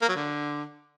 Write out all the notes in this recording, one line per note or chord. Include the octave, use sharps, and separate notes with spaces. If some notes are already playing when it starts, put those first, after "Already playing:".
A#3
F#3
D3